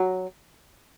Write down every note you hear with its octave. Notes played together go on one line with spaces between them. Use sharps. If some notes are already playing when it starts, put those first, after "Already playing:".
Already playing: F#3